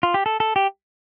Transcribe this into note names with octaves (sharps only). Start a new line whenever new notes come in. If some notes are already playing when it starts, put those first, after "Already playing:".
F4
G4
A4
A4
G4